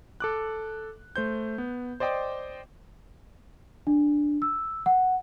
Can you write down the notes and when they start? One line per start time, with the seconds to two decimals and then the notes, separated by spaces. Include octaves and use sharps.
0.20 A4 D6 F#6
1.16 A3 C5 G6
1.58 B3
2.00 C5 D5 D#5 G5 C6 D6
3.87 D4
4.42 E6
4.86 F#5